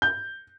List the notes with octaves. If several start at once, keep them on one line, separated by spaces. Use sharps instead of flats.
G6